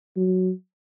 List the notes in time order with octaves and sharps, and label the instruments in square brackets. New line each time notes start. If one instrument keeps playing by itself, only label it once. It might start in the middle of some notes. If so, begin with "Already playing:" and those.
[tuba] F#3